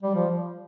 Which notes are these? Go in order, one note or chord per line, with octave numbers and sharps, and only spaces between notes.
G3
F3